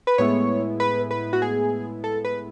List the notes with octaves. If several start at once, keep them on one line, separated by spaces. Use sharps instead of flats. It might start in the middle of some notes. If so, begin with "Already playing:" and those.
B4
A2 G#3 B3 E4 C#5
B4
B4
F#4
G#4
A4
B4